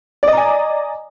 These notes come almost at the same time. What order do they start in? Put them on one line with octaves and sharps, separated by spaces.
D5 D#5 A#5 G#5